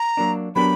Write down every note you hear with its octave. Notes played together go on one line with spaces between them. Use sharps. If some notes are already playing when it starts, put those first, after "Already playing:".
Already playing: A#5
F#3 A#3 D4
F#3 B3 D4 G4 A#4 B5